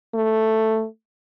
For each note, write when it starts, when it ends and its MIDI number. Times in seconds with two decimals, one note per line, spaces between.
0.14 0.85 57